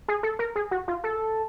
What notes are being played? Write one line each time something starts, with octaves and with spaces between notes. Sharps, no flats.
G#4
A4
A#4
G#4
F#4
F4
A4